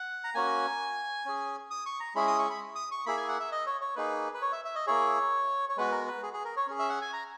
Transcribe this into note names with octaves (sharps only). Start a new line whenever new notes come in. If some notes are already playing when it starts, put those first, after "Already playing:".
Already playing: F#5
A#5
A#3 C#4 F#4 G#5
C#4 G#4
D#6
C#6
A#5
G#3 C#4 E4 G#4 B5
D#6
C#6
B5
D#6
C#6
A#3 E4 G#4 B5
G#5
F#5
E5
D#5
C#5
C#5
A#3 D#4 G#4 B4
B4
C#5
E5
E5
D#5
A#3 E4 G#4 C#5
C#5
G#3 B3 F#4 B4
A#4
B4
G#4
G#4
A#4
C#5
C#4 G#4
E5
F#5
G#5
A#5